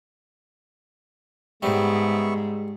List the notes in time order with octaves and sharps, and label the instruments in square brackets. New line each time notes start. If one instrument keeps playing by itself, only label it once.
[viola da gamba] G#2 [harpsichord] G3 C4 [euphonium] G#3 [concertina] B3 E5 C#6